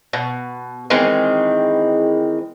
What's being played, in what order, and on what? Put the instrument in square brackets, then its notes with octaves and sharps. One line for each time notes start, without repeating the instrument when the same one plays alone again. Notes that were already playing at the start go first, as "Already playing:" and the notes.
[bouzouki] B2
D#3 E3 G#3 C4